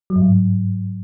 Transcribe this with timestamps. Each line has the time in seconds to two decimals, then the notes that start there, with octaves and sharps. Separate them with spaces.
0.10 F#3
0.16 G2
0.22 G#2